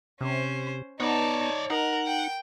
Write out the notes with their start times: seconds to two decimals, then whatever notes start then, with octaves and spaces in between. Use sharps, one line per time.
0.21 C3 C#4 C5
1.00 B3 D#4 C#5 D5 A5
1.70 D#4 A#4 F#5
2.07 G5